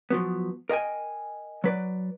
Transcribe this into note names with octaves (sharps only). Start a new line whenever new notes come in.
F3 F#3 B3
A#4 D#5 G5 G#5
F#3 B4 D5